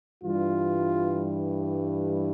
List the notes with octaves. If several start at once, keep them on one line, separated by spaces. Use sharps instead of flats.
G2 E3 G3 F4